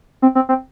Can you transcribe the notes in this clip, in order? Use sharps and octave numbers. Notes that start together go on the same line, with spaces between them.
C4
C4
C4